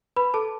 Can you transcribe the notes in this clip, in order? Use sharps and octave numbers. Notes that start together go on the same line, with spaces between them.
B4 B5
A4 A5